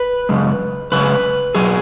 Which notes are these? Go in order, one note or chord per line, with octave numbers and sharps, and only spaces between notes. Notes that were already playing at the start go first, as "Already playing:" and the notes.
Already playing: B4
F#2 C#3 G#3
F#2 C#3 G#3 B4
B2 F#3 G#4